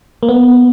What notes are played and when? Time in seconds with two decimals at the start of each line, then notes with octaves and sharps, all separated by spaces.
0.23 A#3
0.29 B3